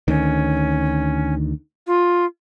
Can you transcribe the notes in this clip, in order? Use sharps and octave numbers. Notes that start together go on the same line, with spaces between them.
D2 D#3 C#4
F4